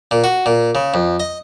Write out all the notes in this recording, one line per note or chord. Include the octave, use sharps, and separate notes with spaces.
A#2
F#4
A#2
C#3
F2
D#5